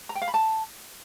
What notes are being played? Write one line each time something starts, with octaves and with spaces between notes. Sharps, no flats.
A#5
G5
F5
B5
A5